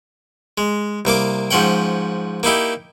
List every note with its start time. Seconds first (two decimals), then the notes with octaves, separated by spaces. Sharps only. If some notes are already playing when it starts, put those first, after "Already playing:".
0.58 G#3
1.05 C2 A#3 A#4 D6
1.51 G#2 F3 C#4 F#5 G5
2.43 A#3 D#4 E4 G4